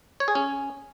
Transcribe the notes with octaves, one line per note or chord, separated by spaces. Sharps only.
C#5
G#4
C#4